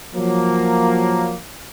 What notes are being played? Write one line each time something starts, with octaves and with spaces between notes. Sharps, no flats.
F3 F#3 A#3